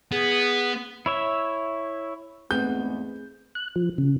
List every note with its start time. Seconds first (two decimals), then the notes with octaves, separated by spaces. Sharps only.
0.12 B3 G#4
1.06 E4 C#5 E5
2.51 E2 G#2 A3 B3 C4 G#4 G6
3.55 F#6
3.76 F3
3.98 C#3